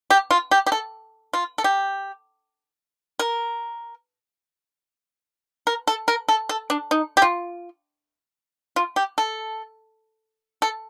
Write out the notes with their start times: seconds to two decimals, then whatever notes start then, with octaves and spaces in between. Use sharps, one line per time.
0.10 G4
0.31 F4
0.51 G4
0.66 G4
0.72 A4
1.33 F4
1.58 A4
1.64 G4
3.19 A#4
5.67 A#4
5.87 A4
6.08 A#4
6.28 A4
6.49 A4
6.70 D4
6.91 D#4
7.17 G4
7.22 F4
8.76 F4
8.96 G4
9.18 A4
10.62 A4